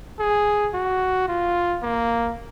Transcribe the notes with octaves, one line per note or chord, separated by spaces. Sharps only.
G#4
F#4
F4
A#3